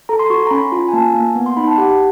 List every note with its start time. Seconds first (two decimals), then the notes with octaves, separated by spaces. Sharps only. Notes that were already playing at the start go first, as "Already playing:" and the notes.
0.09 A4 A#5
0.19 C6
0.30 F#4 C#6
0.40 C6
0.47 A#5
0.51 C#4 B5
0.72 F4
0.88 G#5
0.93 A#3 A5
1.15 A#3
1.35 B3
1.46 C6
1.57 D#4 B5
1.67 A5
1.78 G4 F#5